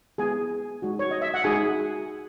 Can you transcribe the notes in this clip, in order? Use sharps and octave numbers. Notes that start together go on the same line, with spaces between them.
G#3 B3 E4 G#4 G#5
G#3 D#4 F#4
C#5
D#5
E5
F#5
G#3 D#4 F#4 G#4 G#5